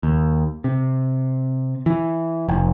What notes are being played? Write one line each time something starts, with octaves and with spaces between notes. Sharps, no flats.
D#2
C3
E3
F1